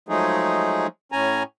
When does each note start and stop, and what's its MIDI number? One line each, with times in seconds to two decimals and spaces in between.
0.09 0.87 53
0.09 0.87 54
0.09 0.87 56
0.09 0.87 57
0.09 0.87 63
0.09 0.87 68
1.12 1.43 45
1.12 1.43 61
1.12 1.43 80
1.12 1.43 82